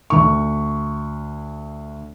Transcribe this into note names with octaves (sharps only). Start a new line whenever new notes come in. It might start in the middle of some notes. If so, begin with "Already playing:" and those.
D2 C#6